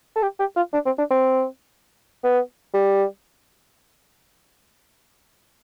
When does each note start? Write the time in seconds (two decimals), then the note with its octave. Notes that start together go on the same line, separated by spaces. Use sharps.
0.16 A4
0.22 G4
0.40 G4
0.57 F4
0.73 D4
0.86 C4
0.98 D4
1.11 C4
2.24 B3
2.74 G3